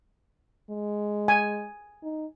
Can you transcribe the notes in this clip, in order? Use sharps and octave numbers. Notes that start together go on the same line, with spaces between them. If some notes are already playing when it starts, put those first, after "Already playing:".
G#3
G#5
D#4